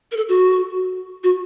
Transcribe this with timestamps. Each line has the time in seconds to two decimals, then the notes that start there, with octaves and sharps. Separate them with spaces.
0.11 A#4
0.17 A4
0.29 F#4
1.23 F#4